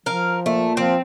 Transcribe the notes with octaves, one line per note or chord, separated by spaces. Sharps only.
F3 A#4 F5
A#2 A3
F3 C4